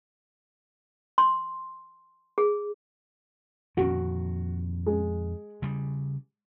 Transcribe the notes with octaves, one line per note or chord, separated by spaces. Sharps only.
C6
G#4
F2 A#2 D#3 F#4
G#3
C#3 G3